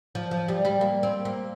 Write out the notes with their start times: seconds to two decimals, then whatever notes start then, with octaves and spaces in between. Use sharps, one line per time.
0.15 F3
0.31 F3
0.48 G3
0.65 G3
0.81 A#3
1.03 C4
1.25 A#3